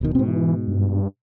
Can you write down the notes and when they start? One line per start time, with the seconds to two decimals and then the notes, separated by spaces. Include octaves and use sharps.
0.01 D1 B2 D#3
0.15 G#2 B2 C4
0.27 E3
0.68 G2